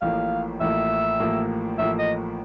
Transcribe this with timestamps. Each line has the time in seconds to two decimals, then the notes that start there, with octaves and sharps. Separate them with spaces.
0.02 A1 A2 F3 A#3 F5
0.60 A1 A2 F3 A#3 E5
1.20 A1 A2 F3 A#3
1.78 A1 A2 F3 A#3 E5
1.99 D#5